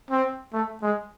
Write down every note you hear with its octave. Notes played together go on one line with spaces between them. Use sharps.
C4
A3
G#3